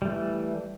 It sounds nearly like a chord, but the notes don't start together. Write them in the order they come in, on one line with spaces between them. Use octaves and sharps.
G3 A3 E3